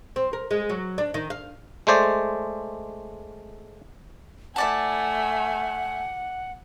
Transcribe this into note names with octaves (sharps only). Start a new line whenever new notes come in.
C4
A#4
G#3
F#3
D4
D#3
F5
G#3 A3 C5 D5
A3 E4 D5 F#5 G#5 A5